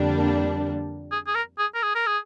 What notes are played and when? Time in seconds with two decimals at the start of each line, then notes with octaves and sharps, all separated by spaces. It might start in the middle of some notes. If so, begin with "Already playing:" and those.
Already playing: F2 D3 G3 A#3 D4
1.12 G#4
1.27 G#4
1.35 A#4
1.58 G#4
1.75 A#4
1.83 G#4
1.95 A#4
2.06 G#4